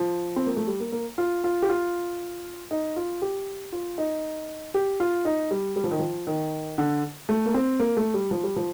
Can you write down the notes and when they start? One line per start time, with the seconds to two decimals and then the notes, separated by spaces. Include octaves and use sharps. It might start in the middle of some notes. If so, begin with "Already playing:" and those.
Already playing: F3
0.36 C4
0.46 A#3
0.57 A3
0.67 G3
0.80 A#3
0.92 A#3
1.18 F4
1.44 F4
1.62 G4
1.69 F4
2.71 D#4
2.96 F4
3.22 G4
3.72 F4
3.98 D#4
4.74 G4
5.00 F4
5.25 D#4
5.51 G3
5.76 G3
5.84 F3
5.91 D#3
5.99 F3
6.27 D#3
6.78 D3
7.29 A3
7.46 A#3
7.54 C4
7.79 A#3
7.97 A3
8.14 G3
8.31 F3
8.43 G3
8.56 F3